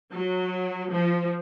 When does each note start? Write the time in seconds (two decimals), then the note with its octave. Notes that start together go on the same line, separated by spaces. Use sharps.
0.12 F#3
0.91 F3